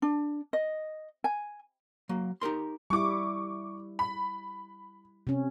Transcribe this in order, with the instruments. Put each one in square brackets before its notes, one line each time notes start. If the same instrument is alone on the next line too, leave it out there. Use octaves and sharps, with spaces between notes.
[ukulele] D4
D#5
G#5
[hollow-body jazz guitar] F#3 A#3
D#4 G4 A#4 C6
[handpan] G3 E4 [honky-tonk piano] C#6 D6
[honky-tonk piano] B5
[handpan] C3 C#4